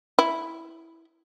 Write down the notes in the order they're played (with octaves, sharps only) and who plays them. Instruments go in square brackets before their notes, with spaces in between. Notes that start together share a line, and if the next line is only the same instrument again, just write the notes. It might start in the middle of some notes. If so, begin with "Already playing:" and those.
[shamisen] E4